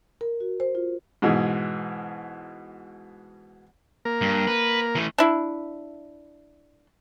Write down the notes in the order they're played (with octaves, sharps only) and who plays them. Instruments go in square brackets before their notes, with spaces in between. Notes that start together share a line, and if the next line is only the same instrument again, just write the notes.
[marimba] A#4
F#4
C5
F4
[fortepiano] G#2 B2 E3 G#3
[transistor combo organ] A#3 A#4
[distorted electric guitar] G2
B4
E3 A3
[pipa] D4 E4